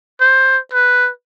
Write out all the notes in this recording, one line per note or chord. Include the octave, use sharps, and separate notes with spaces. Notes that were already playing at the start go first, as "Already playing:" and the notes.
C5
B4